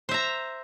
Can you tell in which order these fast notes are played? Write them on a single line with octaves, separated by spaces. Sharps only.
C5 E5 A#5